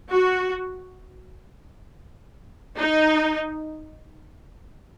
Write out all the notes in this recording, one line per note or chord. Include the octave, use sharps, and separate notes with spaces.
F#4
D#4